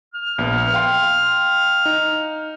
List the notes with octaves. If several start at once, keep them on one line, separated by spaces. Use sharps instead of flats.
F6
A#1 B3
F5 G5 C6
D#4